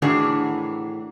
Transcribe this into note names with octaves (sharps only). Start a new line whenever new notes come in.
A2 D#3 E3 D4 F#4 G#4